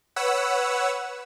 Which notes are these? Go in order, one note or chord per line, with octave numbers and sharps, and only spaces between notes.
B4 C#5 F#5 E6